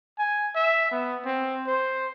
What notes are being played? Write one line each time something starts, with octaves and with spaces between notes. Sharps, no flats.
G#5
E5
B3
C4
C5